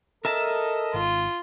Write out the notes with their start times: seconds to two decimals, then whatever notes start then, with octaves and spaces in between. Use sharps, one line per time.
0.25 A4 A#4 D#5 E5 A5
0.94 G#1 F4